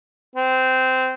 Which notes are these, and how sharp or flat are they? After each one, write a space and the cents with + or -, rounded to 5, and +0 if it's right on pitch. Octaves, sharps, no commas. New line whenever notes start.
C4 -15